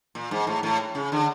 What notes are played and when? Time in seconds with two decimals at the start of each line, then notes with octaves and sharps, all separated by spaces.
0.15 A#2
0.31 G#2
0.47 A2
0.63 A2
0.95 C#3
1.12 D3